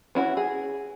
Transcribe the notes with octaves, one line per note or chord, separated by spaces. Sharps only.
C#4 E4 F#4
G#4